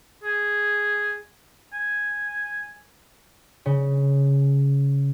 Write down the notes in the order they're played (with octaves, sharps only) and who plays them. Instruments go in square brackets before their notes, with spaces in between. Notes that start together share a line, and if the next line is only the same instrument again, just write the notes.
[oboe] G#4
G#5
[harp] C#3